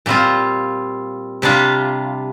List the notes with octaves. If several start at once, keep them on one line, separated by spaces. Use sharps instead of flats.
A#2 G3 C4 F4
C3 G3 D4 F4